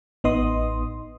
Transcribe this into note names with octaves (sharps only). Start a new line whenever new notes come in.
A1 B3 D#4 D#5 C6 D#6